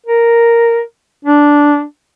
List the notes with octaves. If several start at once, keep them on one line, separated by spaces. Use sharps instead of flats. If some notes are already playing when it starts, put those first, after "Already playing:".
A#4
D4